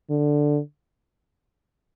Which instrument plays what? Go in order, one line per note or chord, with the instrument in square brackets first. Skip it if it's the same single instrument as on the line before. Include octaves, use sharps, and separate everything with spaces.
[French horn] D3